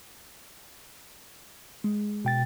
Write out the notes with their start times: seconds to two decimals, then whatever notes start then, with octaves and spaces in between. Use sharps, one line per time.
1.84 G#3
2.25 B2 G5 A6